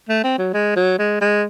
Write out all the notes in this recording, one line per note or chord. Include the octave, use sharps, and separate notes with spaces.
A3
C4
F#3
G#3
F#3
G#3
G#3